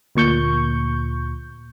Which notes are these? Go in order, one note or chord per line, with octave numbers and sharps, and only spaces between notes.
D2 A#2 C#6 G6